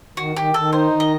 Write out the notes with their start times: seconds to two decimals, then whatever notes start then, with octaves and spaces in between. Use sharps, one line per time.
0.17 D#3 F#4
0.36 D#3 G4
0.54 D#3 A4
0.73 D#4 C5
0.91 D#3
1.00 D#5